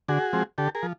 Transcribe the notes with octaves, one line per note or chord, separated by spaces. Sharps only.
D3 F#4 G#4
F3 G#3 C4
D3 G4 A4
G#4 A#4
F3